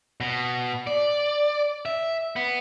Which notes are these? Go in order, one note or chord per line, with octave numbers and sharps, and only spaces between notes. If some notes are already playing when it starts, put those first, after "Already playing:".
B2
D5
E5
B3